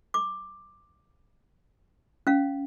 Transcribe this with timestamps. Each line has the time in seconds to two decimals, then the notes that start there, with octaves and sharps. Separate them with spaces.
0.14 D6
2.27 C#4 F5